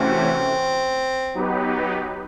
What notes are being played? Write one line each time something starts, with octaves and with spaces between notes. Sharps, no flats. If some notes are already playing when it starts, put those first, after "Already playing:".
Already playing: C3 E3 A3 C4 C#4 F#4
F#3 B3 D#4 G4 B4